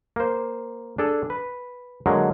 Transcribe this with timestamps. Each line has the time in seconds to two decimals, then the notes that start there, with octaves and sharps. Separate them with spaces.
0.16 A#3 C5
0.98 D4 G#4 A4
1.30 B4
2.06 D3 F#3 G#3 A#3